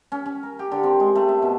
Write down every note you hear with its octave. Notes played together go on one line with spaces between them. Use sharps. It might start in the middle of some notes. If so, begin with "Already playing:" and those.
C#4
C#4
A#4
G4
D3
C4
G#3
A3
E5
B2